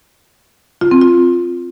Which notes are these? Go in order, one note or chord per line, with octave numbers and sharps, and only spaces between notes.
F4
C4
F4